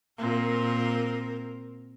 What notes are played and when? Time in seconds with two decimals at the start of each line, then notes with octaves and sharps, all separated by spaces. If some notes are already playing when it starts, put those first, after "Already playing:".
0.18 A#2 C4 A#4